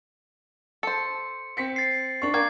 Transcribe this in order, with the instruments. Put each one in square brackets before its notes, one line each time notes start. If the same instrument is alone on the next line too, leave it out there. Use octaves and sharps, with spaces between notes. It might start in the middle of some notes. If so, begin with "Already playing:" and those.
[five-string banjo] A4 C5 [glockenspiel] C#7
[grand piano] C4 B6 C#7
[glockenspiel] A6 C7
[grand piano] D4 C#6
[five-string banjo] A#3 G5 [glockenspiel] D6 G#6